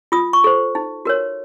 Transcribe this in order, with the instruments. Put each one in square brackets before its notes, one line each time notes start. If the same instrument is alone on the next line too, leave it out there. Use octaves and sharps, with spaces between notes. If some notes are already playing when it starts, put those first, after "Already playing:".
[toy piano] F4 D#6
C#6
A4 C5
D#4
F#4 A#4 C#5